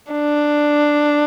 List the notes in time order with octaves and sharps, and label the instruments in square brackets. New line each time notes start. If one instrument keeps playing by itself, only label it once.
[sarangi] D4